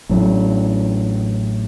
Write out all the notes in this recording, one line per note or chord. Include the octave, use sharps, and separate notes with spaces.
A1 A2 F#3